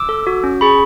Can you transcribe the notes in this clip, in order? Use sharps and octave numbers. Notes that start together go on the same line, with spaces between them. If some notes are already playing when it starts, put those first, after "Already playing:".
Already playing: D6 E6
A4
F#4
C#4
G#4 B5 C#6